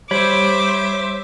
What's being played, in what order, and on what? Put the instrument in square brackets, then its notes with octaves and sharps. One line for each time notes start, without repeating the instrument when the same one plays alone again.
[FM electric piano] G3 [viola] C5 E5 [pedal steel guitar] C#5 B5 [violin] D6